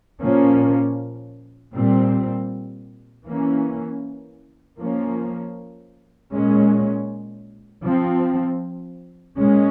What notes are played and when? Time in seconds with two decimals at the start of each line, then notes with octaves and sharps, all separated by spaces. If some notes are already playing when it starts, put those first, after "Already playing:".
0.20 A#2 F3 A#3 C#4
1.73 A#2 G3 C4
3.26 E3 A#3 C#4
4.78 F3 A#3 C#4
6.32 A#2 G#3 C#4
7.84 F3 C4
9.38 A#2 G#3 C#4